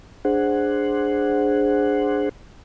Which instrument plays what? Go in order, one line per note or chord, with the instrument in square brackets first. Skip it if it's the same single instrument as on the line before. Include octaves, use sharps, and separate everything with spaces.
[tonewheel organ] D4 G#4 C5 F#5